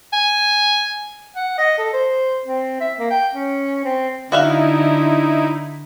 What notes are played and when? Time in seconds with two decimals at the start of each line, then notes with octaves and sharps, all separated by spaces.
0.13 G#5
1.36 F#5
1.58 D#5
1.78 A4
1.93 C5
2.45 C4
2.80 E5
2.99 A#3
3.10 G5
3.34 C#4
3.84 C4
4.32 D3 D#4 E4 F#4 E5 F5